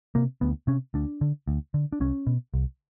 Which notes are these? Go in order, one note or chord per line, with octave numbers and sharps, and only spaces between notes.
C3 A#3
D2 B3
C3 C#4
D2 D4
D3
D2
D3
D4
C2 C#4
B2
C2